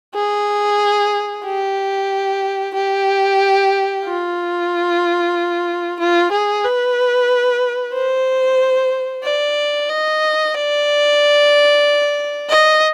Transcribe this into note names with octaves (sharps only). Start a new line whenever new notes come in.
G#4
G4
G4
F4
F4
G#4
B4
C5
D5
D#5
D5
D#5